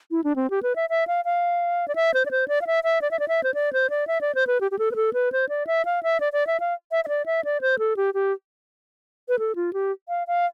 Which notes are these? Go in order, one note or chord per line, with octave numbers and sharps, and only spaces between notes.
E4
D4
C4
G4
B4
E5
E5
F5
F5
D5
E5
C5
D5
C5
D5
F5
E5
E5
D5
E5
D5
E5
C5
D5
C5
D5
E5
D5
C5
B4
G4
G4
A4
B4
A4
B4
C5
D5
E5
F5
E5
D5
D5
E5
F5
E5
E5
D5
E5
D5
C5
A4
G4
G4
B4
A4
F4
G4
F5
F5